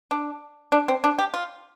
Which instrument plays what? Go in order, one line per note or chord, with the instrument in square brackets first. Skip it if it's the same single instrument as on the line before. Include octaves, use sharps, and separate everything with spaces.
[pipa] D4
D4
C4
D4
G4
F4